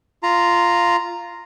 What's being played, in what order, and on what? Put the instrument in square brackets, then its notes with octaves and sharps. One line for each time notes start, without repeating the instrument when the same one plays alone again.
[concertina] F4 A#5